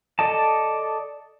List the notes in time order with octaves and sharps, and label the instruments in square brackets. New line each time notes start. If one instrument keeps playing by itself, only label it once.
[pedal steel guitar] A4 D5 D#5 A5